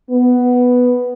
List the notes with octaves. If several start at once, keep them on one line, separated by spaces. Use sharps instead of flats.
B3